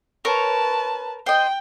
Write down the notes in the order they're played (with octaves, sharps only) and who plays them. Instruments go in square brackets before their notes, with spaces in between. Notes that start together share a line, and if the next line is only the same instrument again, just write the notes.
[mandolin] A#4 C#5 [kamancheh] B4 A5
[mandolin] C5 D#5 [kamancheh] G5